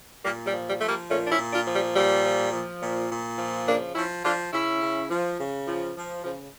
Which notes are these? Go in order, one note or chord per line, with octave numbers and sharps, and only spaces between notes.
A#2 G3 A#3
G3
F3
G3
F3 A3
G3 A#3
A#2 A3 C#4
D4
C#4 E4
A#2
D4 F4
F3
G3
A#2 G3
F3
F3
A#2
A#2
F3
C#3 A#3 D4
F3 C#4 E4
F3 D4 F4
C#3 C#4 E4
C#3
F3
C#3
F3
F3
C#3 F3